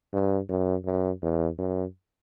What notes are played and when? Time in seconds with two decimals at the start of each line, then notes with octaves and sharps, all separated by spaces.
0.13 G2
0.49 F#2
0.85 F#2
1.22 E2
1.58 F#2